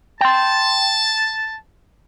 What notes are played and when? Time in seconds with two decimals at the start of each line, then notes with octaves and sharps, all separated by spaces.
0.21 G5 A5 C6